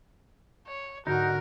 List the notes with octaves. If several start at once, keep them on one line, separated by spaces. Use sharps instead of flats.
C#5
G#2 D3 D#4 F#4 A#4